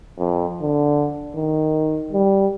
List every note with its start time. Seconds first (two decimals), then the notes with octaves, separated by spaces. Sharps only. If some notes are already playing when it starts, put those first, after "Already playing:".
0.19 F2
0.62 D3
1.35 D#3
2.13 G3